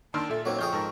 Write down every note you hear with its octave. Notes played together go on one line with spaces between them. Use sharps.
D#3 A#3 D4 A5 C6 E6 F6
A#2 A4 E5
F#3 A#3 C4 D#4 F#4 A#4 C#5
F2 G#4 G5 C#6 D#6 F6 G6
G#2 A#4 A5 E6